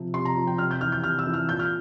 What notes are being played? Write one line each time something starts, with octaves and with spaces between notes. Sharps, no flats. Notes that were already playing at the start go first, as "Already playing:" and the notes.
Already playing: C3 F3
C3 C6
A#5
F3
G5
C3 F6
G6
E3 F6
G6
C3 F6
E6
E3
F6
A#2 G6
F6